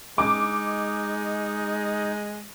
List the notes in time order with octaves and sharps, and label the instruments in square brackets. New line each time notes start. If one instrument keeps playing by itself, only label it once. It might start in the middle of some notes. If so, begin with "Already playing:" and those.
[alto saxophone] G#3 [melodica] D#4 [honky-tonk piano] D6